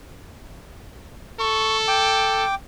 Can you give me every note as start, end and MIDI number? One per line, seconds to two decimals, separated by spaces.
1.40 2.44 69
1.40 1.77 85
1.88 2.55 79
1.88 2.55 86